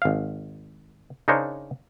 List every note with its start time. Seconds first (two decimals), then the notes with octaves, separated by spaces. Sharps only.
0.02 G#1 F5
1.28 C#3 D4 D#4 A#4 C5 C#5